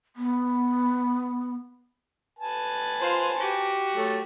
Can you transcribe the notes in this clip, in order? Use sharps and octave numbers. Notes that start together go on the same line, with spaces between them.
B3
B4 G#5 A5
F4 C5
F#4 G4
F#3 A3